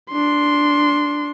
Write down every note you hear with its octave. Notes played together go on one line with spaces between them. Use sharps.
D4 C6